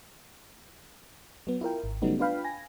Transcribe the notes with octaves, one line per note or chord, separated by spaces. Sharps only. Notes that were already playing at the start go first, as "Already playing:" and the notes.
F#3 B3
E4 F4 A#4 G5
G#1
C#3 F#3 G3 A3 B3 D#4
D4 F4 B4 F5 G5 B5
G#5 A#6